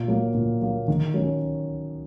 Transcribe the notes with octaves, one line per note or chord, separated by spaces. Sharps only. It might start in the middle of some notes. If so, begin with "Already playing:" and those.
Already playing: A#2
F#3 A#3
A#2
F#3 A#3
D#3
F#3 C#4